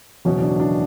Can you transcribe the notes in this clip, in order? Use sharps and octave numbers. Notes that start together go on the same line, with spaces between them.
F#1 E2 B2 C#4
D4
D4